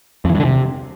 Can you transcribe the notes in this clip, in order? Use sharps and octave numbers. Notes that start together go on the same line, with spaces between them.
F2
E3
G2
D3
C3